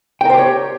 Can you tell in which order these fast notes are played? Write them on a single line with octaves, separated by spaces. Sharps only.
G5 A#4 C5 G4 C#5